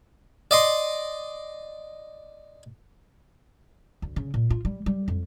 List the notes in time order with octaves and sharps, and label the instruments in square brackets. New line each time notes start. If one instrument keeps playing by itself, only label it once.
[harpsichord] D5 D#5 C6
[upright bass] D2
C#3
A#2
F4
G3
G3
F2